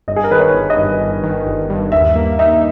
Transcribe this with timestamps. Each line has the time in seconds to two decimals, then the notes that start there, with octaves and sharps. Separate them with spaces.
0.08 G1 D#5
0.16 G#4
0.24 A#4
0.31 D#3 B4
0.39 C#5
0.54 G1
0.70 D#5
0.77 G2
1.00 G1
1.23 D#3
1.46 G1
1.70 G2
1.92 D#2 E5
2.15 A#3
2.39 D#4 E5